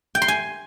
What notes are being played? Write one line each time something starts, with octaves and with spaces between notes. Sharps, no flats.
G5
C6
G#5